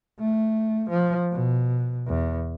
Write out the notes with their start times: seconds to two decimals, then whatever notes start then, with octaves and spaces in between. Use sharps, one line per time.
0.19 A3
0.90 F3
1.32 B2
2.07 E2